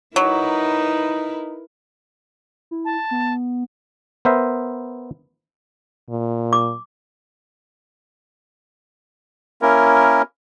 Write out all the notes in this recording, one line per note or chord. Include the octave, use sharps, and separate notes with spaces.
F#3 D#4 E4 A#4 B4
E4
A5
B3
B3 A#4 C5 E5
A#2
D6
A#3 C#4 E4 A#4